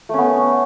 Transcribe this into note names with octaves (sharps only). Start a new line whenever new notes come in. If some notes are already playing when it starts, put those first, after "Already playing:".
A3 B3 C#4